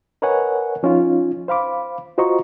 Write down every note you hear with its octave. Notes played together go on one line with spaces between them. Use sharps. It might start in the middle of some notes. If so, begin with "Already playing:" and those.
A#4 B4 C#5 D#5 F#5 G#5
F3 C#4 D#4 F4
C5 F5 B5 D6
F4 F#4 C5 D#5 A#5 C#6